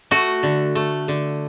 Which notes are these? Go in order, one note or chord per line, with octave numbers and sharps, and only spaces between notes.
A3 F#4
D3
A3
D3